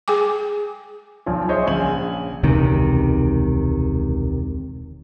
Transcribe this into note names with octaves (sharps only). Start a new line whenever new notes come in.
G#4 G5 G#5 D6
B1 F3 D5 G#5
G#4 C5 C#5 D#5 E5
A#1 C#3 G#5 F#7
E1 C#2 C3 D#3